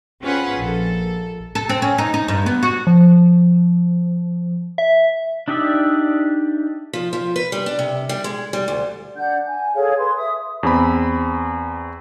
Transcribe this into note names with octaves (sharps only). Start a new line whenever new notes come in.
C4 C#4 F4 G#4 B4 F#5
A#1 A4
A4
C4
C#4
D#4
D#4
G2
B3
F#4
F3
E5
D4 D#4 G4 D5 E5
F3
F3
B4
G3
D4
C3
G3
G#3
G3
D2
D4 F#5 G6
G#5
G#4 A4 C#5 F5
B4 C6
E5 D#6
E2 C4 B5